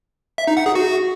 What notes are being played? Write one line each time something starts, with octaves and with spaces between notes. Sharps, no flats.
E5
D#4
F#5
G#4
F#4